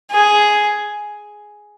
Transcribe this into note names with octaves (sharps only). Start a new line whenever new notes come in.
G#4